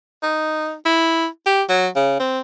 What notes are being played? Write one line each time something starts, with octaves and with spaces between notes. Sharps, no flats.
D#4
E4
G4
F#3
C#3
C4